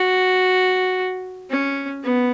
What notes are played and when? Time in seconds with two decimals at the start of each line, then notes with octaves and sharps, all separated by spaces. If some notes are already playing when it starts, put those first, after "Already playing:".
Already playing: F#4
1.50 C#4
2.03 B3